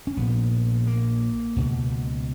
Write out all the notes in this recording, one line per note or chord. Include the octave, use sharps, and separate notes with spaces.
C#4
A#1 A#2 B3
A#3
C#2 B2